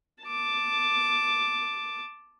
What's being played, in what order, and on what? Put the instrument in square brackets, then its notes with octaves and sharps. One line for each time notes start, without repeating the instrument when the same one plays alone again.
[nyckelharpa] A5 D6